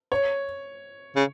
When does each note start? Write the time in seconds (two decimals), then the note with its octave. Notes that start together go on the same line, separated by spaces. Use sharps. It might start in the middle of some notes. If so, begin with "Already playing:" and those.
0.12 C#5
1.16 C#3